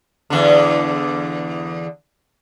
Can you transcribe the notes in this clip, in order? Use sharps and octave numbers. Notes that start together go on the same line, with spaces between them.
E2 D3